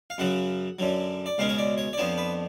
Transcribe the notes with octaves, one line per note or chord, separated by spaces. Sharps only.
F5
F#2 C#3 F#3 F#5
F#2 D3 F#3
D5
C#2 B2 G#3 C#4 F5
C#5
D5
C#5
D5
F2 F3 B3 D4 C#5
B4